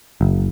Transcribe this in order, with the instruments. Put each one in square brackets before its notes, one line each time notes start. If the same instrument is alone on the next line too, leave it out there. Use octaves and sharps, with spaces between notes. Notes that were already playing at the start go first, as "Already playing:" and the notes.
[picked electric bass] F#1